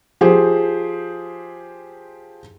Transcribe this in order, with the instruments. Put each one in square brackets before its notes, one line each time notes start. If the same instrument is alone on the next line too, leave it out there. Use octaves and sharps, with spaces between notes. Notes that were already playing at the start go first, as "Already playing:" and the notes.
[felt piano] F3 G4 G#4 C5